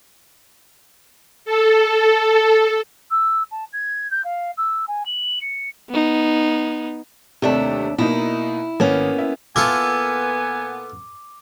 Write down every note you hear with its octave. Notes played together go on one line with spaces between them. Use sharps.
A4
E6
A5
G#6
G6
F5
E6
G#5
F#7
C#7
B3 D#4
D#2 C3 A3 D4 E5
B2 A#3 D#4 E4
G#1 A#3 B3 C#4
E4
A#2 B3 E4 F4 A4 G#5 D6